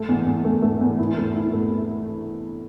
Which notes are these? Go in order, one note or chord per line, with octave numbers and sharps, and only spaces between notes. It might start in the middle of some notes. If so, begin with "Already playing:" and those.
Already playing: A3
E2
E2
A3
A3
E2
E4
A3
E4
A3